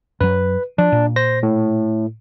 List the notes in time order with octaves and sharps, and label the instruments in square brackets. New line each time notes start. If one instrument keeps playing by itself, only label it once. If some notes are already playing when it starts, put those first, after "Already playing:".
[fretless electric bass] F#2 F#3 [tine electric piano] B4
[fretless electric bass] F3 [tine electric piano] D4
[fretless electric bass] A#2
[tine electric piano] C5 A#6
A2